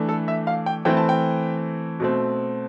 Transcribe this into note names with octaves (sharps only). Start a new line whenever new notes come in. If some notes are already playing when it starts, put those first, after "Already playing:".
Already playing: E3 A3 D4
A4
E5
F5
G5
E3 A3 C4 G5
A5
G5
B2 A3 C4